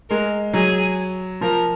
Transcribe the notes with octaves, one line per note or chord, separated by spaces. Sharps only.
G#3 A#4
F#3 G#4
F3 A#4